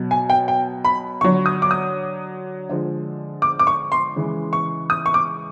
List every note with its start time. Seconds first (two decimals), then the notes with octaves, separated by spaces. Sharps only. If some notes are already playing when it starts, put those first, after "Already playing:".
Already playing: B2 F#3
0.11 G#5
0.30 G5
0.48 G5
0.85 B5
1.21 D3 F#3 C#6
1.46 D#6
1.62 D6
1.71 D#6
2.69 D3 F3 G#3
3.42 D6
3.59 D6
3.67 C#6
3.92 C6
4.16 C#3 E3 G#3
4.53 C#6
4.90 D#6
5.06 C#6
5.14 D6